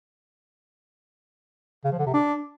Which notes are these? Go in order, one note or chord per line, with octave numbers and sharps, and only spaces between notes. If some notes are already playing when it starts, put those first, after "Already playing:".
C#3
F3
D3
C3
D4